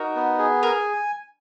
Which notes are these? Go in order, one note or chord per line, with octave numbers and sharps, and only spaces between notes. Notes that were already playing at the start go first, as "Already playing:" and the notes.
Already playing: D#4 F#4 A#4
B3
G#4
A#4 G#5